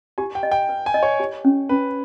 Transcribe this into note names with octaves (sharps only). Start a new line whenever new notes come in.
G4 G#5
G5
D#5
G5
B4
G#5
D#5
C#5
G4
C#4
C#4 B4